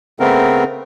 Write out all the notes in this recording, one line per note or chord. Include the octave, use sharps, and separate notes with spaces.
C#3 A3 B3 C4 A#4